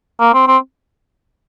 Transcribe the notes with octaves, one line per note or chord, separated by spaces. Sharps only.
A#3
C4
C4